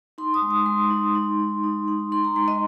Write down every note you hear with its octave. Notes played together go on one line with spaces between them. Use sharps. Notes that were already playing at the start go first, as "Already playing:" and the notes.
D#4 C6
D#6
G#3
D#6
G#3 C6
D#4
D#4
D#4
D#4
D#4
D#4 C6
A#5
G#3 C6
D#5